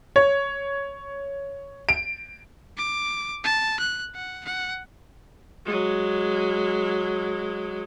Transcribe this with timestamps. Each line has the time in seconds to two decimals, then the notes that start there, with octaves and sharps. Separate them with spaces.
0.16 C#5
1.89 D7
2.78 D6
3.44 A5
3.80 F#6
4.15 F#5
4.45 F#5
5.65 F#3 G#3